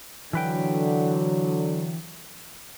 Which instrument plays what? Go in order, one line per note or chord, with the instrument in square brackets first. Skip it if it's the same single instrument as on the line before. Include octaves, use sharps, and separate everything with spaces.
[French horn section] D3 F#3 [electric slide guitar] E3 B4 G5